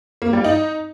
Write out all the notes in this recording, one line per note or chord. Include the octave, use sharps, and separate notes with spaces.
A#3
G3
D#4